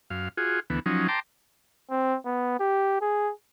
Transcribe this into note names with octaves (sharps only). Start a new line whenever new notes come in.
F#2 F5
F4 F#4 G#4
D2 E3 B3
F3 F#3 C#4 D#4
G5 A5 A#5 C6 D6
C4
B3
G4
G#4